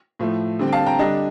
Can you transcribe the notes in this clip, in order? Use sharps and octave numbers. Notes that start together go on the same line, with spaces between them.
A2 F3 A3
D3 G3 C4
G5
F5 A5
G5 A#5
D3 G3 D4 D#5